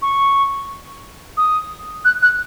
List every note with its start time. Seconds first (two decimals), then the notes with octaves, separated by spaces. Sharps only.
0.02 C#6
1.37 D#6
2.05 F#6
2.22 F#6